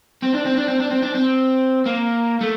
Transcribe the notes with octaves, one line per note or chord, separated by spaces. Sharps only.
C4
D4
C4
D4
C4
D4
C4
D4
C4
A#3
A3